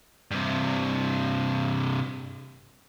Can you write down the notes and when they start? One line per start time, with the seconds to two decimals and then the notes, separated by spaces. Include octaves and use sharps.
0.31 G2 C3